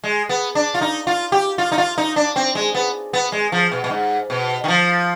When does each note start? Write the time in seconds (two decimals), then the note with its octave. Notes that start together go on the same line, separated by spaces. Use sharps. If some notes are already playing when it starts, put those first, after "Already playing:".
0.04 G#3
0.29 B3
0.55 D4
0.74 F4
0.81 D#4
1.07 F4
1.32 G4
1.58 F4
1.72 D#4
1.78 F4
1.98 D#4
2.16 D4
2.36 C4
2.55 G#3
2.75 B3
3.13 B3
3.32 G#3
3.52 F3
3.72 B2
3.84 B2
3.90 G#2
4.30 B2
4.64 D#3
4.68 F3